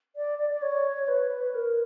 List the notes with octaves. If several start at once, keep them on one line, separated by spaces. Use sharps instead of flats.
D5
D5
D5
C#5
C#5
B4
A#4